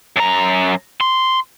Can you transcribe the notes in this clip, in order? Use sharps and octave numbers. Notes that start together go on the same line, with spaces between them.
F#2 A#5
C6